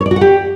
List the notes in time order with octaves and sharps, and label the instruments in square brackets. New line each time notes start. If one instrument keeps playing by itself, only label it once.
[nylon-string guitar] C#5
D5
F#4
F#5
G4